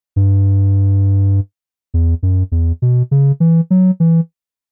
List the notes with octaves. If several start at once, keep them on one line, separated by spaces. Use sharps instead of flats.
G2
E2
F#2
E2
B2
C#3
E3
F#3
E3